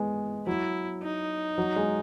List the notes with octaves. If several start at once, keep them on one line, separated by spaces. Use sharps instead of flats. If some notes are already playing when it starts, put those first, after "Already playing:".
Already playing: G#3 B3
F#3 E4
D#4
F#3
G#3